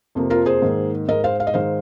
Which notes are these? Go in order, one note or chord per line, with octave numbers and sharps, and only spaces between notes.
F2 C3 F3 A#3
F4 A#4
G#4 C5
G#2 D#3 A#3
G#2 G#3 A#4 D#5
C5 F5
F5
D#5
G#2 D#3 G#3 C5 F5